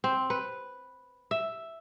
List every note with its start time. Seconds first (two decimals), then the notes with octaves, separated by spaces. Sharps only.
0.04 C4
0.30 B4
1.31 E5